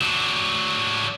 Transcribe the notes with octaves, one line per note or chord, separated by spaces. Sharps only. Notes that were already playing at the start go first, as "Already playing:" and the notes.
F#3 D4